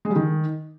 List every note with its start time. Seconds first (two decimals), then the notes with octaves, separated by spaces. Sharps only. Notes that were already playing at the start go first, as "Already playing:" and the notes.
0.05 G#3
0.10 G3
0.16 D#3